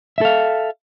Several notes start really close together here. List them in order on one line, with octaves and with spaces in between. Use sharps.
E5 A4 F5